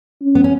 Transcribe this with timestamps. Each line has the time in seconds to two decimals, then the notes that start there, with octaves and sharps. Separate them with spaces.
0.22 C#4
0.35 B3
0.44 C#4